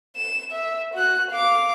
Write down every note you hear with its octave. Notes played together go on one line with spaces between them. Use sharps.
E7
E5
F#4 F#6
F5 D6